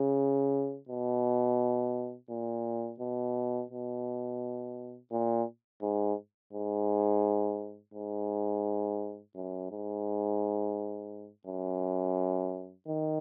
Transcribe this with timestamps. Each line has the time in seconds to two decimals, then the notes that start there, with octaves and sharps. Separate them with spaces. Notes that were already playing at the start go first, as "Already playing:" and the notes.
Already playing: C#3
0.89 B2
2.30 A#2
3.00 B2
3.71 B2
5.12 A#2
5.82 G#2
6.53 G#2
7.94 G#2
9.35 F#2
9.71 G#2
11.47 F#2
12.88 D#3